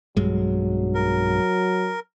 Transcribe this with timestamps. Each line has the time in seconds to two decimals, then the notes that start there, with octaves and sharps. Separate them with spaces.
0.17 B1 G2 F#3 G#3
0.95 A#4